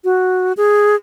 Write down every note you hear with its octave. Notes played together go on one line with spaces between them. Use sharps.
F#4
G#4